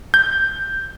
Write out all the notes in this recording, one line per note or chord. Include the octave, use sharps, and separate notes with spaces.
G6